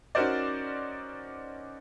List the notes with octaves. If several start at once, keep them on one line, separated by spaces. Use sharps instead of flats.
C#4 D#4 F#4 A#4 C5 D5